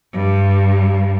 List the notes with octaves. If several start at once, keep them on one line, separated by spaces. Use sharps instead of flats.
G2